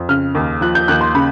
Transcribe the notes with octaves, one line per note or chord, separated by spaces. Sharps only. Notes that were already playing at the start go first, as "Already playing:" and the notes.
Already playing: F2
C#3 F6
D#2
F3 F#6
G6
D#2 F#6
C6
C#3 B5